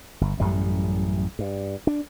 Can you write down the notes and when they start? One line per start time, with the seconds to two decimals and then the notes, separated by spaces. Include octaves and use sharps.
0.21 G1
0.40 A1 F#2 A2 G3
1.39 G2
1.87 D4